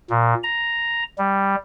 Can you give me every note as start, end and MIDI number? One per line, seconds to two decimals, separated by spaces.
0.10 0.34 46
0.43 1.03 82
1.18 1.56 55